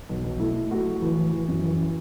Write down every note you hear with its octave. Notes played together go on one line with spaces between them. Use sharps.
B1
B1
A3 E4
A3
A3 F#4
F#3
E3
E3
E3
F#2
E3